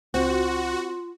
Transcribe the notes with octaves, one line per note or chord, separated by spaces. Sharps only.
C#2 C4 F4 F#4